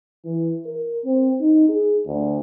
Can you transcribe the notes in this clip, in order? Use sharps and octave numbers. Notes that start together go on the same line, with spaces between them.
E3
A#4
C4
D#4
G#4
D2